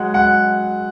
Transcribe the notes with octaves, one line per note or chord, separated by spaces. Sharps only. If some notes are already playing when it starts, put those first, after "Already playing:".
Already playing: F#3 G#3 F#5
G#3 F#5